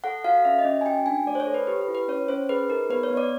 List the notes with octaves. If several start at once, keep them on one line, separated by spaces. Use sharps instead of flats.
A4 F#5
F#4 F5
C#4 E5
D#5
C#4
G#5
F#4 G5
D4 G#5
A3 D5
C5
C#5
A4
B4
G4 B4
B4
E4
B4
C#4 C#5
C#4 C5
G#4 B4
D#4 A#4
B3 B4
C#5
B3
D5